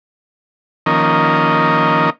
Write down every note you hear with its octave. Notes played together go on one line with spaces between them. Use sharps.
D#3 F3 A#3 C#4 A#4 D#5